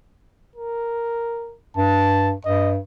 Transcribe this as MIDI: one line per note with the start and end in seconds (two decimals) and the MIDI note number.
0.56 1.56 70
1.77 2.33 43
1.77 2.32 81
2.45 2.78 43
2.45 2.71 75